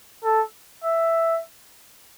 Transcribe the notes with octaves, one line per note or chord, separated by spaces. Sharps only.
A4
E5